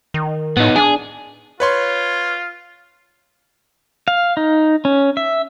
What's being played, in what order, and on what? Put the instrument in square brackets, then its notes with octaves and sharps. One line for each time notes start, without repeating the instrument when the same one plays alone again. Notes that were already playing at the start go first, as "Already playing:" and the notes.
[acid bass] D#3
[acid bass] A2 [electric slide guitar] B3 D#4
[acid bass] D4 [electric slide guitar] G#4
[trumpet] F4 [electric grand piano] B4 C#5 C6
[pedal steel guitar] F5
D#4
C#4
E5